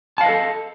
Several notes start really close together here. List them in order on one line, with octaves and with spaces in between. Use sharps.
A5 F5 D#5 B4 A4